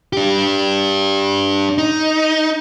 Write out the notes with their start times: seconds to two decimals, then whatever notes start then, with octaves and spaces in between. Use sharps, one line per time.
0.13 D4 G4
1.78 D#4